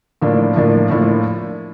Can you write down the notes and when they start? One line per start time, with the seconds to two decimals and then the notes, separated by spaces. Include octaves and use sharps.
0.22 A2 F3 A#3 D4
0.56 A2 F3 A#3 D4
0.90 A2 F3 A#3 D4